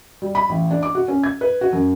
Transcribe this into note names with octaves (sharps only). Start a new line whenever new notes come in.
G3
B5
A1
D4
D6
F#4
C#4
G#6
B4
F#4
F#2